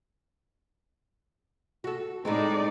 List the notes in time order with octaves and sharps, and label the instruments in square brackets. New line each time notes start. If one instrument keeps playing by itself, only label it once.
[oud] F#4 A4
[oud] A2 G#3 C4 [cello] D#4 D5